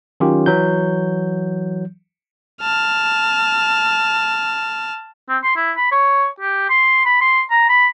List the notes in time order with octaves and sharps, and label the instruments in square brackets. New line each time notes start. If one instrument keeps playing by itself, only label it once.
[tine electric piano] D#3 F#3 C#4 F4 G4
E3 F#3 G6
[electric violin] A5 F6
[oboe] C4
C6
E4
B5
C#5
G4
C6
B5
C6
A#5
B5